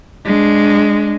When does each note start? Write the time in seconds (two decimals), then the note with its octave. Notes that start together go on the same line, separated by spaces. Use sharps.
0.25 G#3 D4